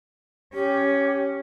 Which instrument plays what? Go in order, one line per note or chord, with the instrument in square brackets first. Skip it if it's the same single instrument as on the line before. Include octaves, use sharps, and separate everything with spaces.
[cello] C#4 [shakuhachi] G4